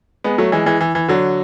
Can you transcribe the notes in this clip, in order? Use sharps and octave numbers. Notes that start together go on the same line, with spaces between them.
G#3 B3
F#3 A3
E3 G#3
E3 G#3
E3
E3
D3 F#3